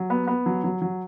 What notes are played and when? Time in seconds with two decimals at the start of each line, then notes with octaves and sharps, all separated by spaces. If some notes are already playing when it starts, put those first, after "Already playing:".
Already playing: F#3
0.10 B3
0.28 B3
0.46 F#3
0.64 F#3
0.82 F#3